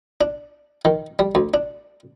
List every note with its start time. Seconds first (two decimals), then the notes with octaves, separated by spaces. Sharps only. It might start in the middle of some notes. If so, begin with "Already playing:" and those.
0.21 D4
0.85 D#3
1.19 G3
1.35 D2
1.54 D4